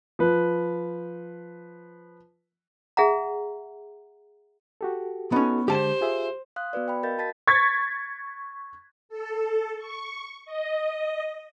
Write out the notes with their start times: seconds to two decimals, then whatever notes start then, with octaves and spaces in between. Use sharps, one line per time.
0.19 F3 B4
2.97 G#4 E5 F#5 A#5
4.81 F#4 G4 A4
5.32 B3 C#4 D#4 F#4 A4
5.68 D3 G#3 G4 C5 A5
6.01 F4 G#4 E5
6.56 F5 C6 D#6 F#6
6.73 B3 F#4 B4 D5
6.88 G5 B5
7.03 A#4 D#5 F5 G6 A6
7.17 F#4 D#5 A5 A6 B6
7.47 C#6 G#6 A6 B6
9.09 A4
9.78 C#6
10.45 D#5